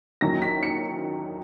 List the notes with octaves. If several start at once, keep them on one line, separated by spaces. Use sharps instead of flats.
D#2 D#3 F#3 C#4 E4 A#6
B6
C#7